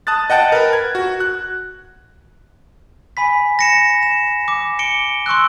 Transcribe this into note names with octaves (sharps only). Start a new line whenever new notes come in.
A5 D#6 F#6 A6
D#5 F#5 G5 A5 F#6 A6
A#4 B4
G#6
F#4
F#6
G#5 B5 B6
A#6 C#7 E7
E7
D6
C#7 D7 G7
C6 C#6 E6 F#6